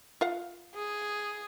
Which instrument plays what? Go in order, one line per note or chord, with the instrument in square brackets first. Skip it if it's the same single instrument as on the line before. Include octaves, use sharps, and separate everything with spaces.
[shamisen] F4 F5 F#5
[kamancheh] G#4